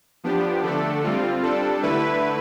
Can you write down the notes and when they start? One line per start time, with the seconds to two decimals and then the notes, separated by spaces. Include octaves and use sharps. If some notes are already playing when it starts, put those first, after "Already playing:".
0.24 F3 B3 D4 G4
0.63 D3 A3 D4 A4
1.04 G3 C4 F4
1.43 G3 D4 A4
1.83 D3 A3 E4 B4